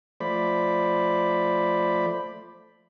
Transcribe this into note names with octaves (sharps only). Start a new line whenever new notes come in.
F3 A3 C5 D5 B5